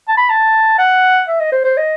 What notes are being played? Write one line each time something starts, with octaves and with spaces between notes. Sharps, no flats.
A5
B5
A5
F#5
E5
D#5
C5
C5
D#5